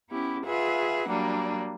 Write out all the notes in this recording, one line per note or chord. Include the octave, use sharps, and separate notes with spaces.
B3 C#4 E4 G4
F4 G#4 B4 E5 F#5
F#3 G3 A#3 D4